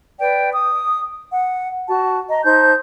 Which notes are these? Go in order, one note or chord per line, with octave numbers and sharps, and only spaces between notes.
B4 D5 G5
D#6
F#5
F#4 A5
D#5 A#5
D#4 C5 A5 G6